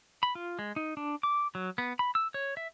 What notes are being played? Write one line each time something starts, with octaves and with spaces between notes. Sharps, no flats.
B5
F4
G#3
D#4
D4
D6
F#3
B3
B5
E6
C#5
E5